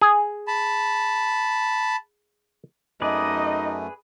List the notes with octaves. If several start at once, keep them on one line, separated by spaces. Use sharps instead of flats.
G#4
A5 B5
F#2 A3 D#4 G#4 B4 D5 D#5